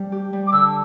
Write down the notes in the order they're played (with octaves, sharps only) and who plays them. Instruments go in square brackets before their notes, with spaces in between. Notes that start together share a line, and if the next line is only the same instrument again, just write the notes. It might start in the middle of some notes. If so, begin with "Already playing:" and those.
Already playing: [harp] G3
G4
G3
[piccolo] D6
[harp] D3 [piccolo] E6